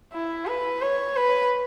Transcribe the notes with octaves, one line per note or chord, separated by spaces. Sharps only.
E4
B4
C#5
B4